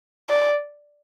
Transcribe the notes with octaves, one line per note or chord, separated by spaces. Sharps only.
D5